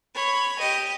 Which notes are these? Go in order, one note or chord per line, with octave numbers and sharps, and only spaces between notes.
C#5 B5
G4 D#5